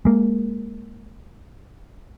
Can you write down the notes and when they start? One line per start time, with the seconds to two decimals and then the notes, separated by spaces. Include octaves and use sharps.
0.05 G#3 A#3